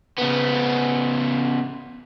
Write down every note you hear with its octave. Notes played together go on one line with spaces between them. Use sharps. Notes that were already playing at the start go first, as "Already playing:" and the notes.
C#3 B3